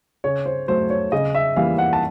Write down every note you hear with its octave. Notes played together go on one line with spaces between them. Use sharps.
C#3 C#5
C5
F#3 A3 C5
C#5
C#3 D#5
E5
E3 G3 A#3 F5
F#5
A5